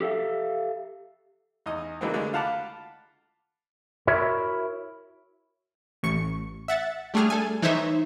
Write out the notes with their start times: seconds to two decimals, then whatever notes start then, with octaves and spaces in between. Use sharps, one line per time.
0.01 G4 A4 E5 F5
1.66 E2 D#4 D#5 D#6
2.01 D3 E3 F#3 G#3 A#3 C4
2.14 D3 G#3 A3
2.33 F4 F5 F#5 A5 B5 D6
4.07 E4 F#4 A#4 C#5 E5
6.03 A1 C#6 C#7
6.68 E5 F#5 A6
7.14 G3 A3 D4 G#4 F6
7.30 A4 G#5
7.62 E3 D#4 C5 C#5 E5